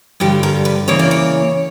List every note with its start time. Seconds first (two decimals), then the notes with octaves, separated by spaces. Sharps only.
0.20 G2 D3 G3 G4
0.43 A#4
0.65 B4
0.88 C#3 E3 A#3 C#5
0.99 D5
1.11 C#5